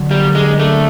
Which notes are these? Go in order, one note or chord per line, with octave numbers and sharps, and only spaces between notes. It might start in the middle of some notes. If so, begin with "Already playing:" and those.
Already playing: D3 F#3
G3 A#3
G#3 D4
A3 D4